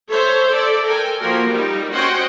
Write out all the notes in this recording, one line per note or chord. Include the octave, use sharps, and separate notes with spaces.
A4 C5 C#5 E5
A4 D5 E5
A4 A#4 G5 G#5
F3 A#3 F#4 A#4
G3 D#4
C#4 F#4 C5 D#5 F#5 G5